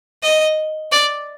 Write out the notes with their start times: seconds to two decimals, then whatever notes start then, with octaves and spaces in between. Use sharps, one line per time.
0.23 D#5
0.92 D5